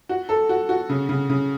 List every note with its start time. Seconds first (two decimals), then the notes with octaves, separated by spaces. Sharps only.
0.09 F#4
0.29 A4
0.49 F#4
0.69 F#4
0.89 C#3
1.09 C#3
1.30 C#3